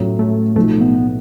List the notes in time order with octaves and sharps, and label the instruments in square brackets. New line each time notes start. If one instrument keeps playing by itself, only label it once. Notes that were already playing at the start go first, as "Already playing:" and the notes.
Already playing: [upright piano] A2 F#3 C#4
[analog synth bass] A3
[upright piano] B1 A2 F3 [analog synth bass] A3
[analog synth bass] B3